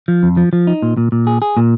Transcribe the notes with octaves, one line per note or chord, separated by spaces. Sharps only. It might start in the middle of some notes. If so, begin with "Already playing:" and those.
F3
F2
F3
F3
D#4
A#2
A#2
A#2
G#4
G#4
A#2